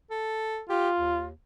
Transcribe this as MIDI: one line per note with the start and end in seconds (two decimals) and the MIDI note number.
0.11 0.61 69
0.70 1.24 65
0.70 0.90 67
0.98 1.31 39